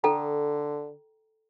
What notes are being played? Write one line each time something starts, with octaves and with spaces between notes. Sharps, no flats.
D3 A4 G5 A#5